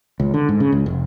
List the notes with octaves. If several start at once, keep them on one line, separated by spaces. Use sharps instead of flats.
C#2
D3
G#2
C#3
C#2
F1